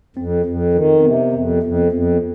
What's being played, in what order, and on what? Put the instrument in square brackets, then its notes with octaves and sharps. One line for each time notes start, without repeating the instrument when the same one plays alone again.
[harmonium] F2 [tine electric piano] C4
[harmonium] F2
D#3
[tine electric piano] C4
[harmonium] C3 [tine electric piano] B3
[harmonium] F2
F2
F2